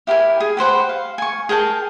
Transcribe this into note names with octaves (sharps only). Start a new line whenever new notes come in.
E4 G4 A#4 G#5
G#4
G4 B4 C5 F#5
F5
G#5 C#6
G#4 A#4 G5 A5